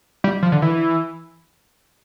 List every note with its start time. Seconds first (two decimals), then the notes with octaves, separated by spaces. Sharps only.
0.24 G3
0.43 F3
0.52 D3
0.62 E3